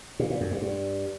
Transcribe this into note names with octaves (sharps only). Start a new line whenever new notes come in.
A#2
A#2
F#2
G2
G2